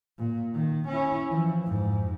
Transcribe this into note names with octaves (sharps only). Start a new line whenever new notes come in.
A#2
D#3
C#4 E4
E3 F3
F2 G#2